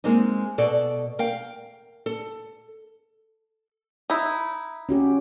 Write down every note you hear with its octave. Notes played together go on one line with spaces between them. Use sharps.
G#3 A#3 C4 D#4
B2 A4 D5
A#4 F5 G5
A4
D#4 E4
C#4 F#4 G4